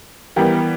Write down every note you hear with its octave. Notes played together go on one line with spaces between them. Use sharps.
E3 G3 B3 G4 A#4